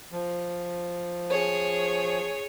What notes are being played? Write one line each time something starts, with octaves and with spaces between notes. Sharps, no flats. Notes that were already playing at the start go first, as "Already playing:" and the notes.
F3
G#4 C#5